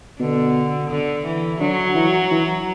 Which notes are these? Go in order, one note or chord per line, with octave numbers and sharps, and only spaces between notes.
B2 D3
D3
E3
D3 F#3
E3
E3